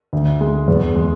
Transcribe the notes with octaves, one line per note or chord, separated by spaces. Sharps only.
D2
G#3
E2
G#3